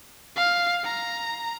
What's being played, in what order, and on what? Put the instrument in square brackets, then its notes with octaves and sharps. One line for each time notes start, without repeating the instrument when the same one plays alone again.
[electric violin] F5
A#5